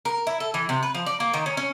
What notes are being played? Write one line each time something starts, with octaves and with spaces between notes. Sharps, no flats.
A#4
E4
A4
E3
C3
B4
F3
D5
A#3
D#3
C#4
C#4